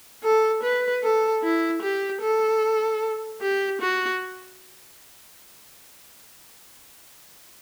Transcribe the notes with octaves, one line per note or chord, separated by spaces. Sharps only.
A4
B4
A4
E4
G4
A4
G4
F#4